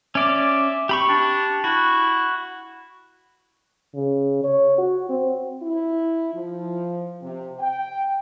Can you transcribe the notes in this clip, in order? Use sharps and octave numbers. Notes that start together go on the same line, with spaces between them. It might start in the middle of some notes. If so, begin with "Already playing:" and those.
C#4 D5 E5 D6
C4 G4 B5 C#6
D4
E4 F#4
C#3
C#5
F#4
C4
E4
F3
C3
G5